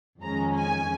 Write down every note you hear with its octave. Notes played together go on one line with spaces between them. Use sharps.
F2 D#3 G#3 C#4 A#5
G#5